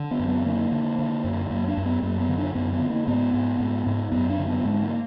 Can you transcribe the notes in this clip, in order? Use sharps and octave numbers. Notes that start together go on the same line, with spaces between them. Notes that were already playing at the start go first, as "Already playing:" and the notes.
Already playing: D3
B3
F#2
B3
D3 A#3
D3
D3
F#2
F#2 A#3
D4
F#2
B3
F#2 A#3
B3
D3
D4
F#2 B3
B3
D3
A#3
G#2 B3
G#2
G#2
G#2
F#2 B3
D4
D3
B3
G#2 G#3
A#3